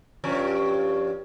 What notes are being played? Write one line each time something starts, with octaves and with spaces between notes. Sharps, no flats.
G2 F3 C#4